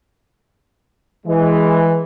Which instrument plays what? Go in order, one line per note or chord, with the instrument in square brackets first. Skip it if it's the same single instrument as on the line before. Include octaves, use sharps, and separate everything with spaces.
[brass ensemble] E3 [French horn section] G#3